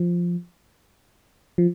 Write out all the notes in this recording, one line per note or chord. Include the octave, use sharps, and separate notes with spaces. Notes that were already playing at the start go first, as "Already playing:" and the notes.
Already playing: F3
F3